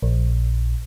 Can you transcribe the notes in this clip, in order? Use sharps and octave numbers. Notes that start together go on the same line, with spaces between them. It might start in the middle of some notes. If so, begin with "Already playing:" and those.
A#1